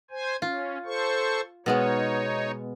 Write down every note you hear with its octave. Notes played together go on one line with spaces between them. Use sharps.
C5 G#5
C#4 F4
A4 C5 C#6
B2 G#3 B3 D#4 C#5